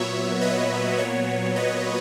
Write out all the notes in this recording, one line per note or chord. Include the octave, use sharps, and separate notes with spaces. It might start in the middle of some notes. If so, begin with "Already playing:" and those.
Already playing: A#2 F#3 B3 C#5 E5
B4 D#5
A#2 F#3 B3 C#5
B4 D#5